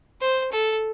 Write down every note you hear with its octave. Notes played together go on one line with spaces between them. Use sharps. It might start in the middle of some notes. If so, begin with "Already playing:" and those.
C5
A4